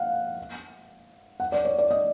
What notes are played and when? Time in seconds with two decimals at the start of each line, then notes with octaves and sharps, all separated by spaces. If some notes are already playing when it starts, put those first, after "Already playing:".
Already playing: F5 F#5
1.40 F#5
1.52 D5
1.65 C#5
1.78 D5
1.91 D#5